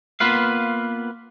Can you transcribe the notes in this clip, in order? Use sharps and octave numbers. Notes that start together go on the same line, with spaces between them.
A#3 B3 F4 B4 F5